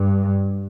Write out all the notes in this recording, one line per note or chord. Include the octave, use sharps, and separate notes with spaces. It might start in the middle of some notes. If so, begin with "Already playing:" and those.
Already playing: G2